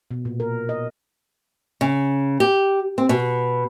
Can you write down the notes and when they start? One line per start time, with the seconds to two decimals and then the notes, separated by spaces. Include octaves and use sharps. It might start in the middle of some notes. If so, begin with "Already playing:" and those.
0.11 B2
0.25 A#2
0.40 A#4
0.69 D#5
1.81 C#3
2.40 G4
2.98 C4
3.09 B2